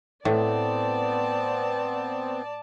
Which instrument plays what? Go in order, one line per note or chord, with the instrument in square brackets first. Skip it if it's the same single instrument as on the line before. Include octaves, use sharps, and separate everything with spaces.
[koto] A2 [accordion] B3 C4 [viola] D5 A5